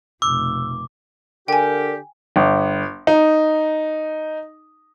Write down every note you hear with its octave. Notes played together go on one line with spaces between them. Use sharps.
F1 B2 D6 E6
D3 G4 A#4 G5 G#5
G1
D#4